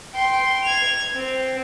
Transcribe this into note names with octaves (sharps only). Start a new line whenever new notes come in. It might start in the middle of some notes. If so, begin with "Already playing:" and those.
G5 C6
G#6 F7
C4